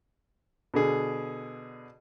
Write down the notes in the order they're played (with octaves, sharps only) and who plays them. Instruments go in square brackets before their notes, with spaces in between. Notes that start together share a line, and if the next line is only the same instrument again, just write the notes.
[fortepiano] B2 D3 G#4